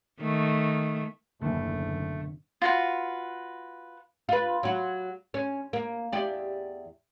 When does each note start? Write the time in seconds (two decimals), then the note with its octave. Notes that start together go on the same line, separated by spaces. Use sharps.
0.21 D#3 A3
1.41 F#1 D#2 B2 D3 E3 A3
2.62 F4 F#4 B4
4.29 F4 B4
4.63 F#3 F#4
5.34 C#4
5.73 A#3
6.12 E2 G4 D5